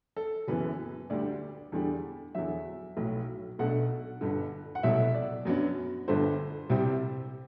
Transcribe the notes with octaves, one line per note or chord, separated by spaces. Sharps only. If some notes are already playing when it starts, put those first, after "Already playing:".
A4
F#1 F#2 E3 B3 B4
D2 D3 G3 D4 D5
E2 D3 G3 D4
E2 D3 F#3 E5
B1 A2 F#3
B1 B2 A3 D4 F#5
G1 G2 D3
F#5
C2 B2 F#3 A3 E5
D5
F#2 F#3 B3 D4
G1 G2 D3 A3 C5
C2 C3 G3 C4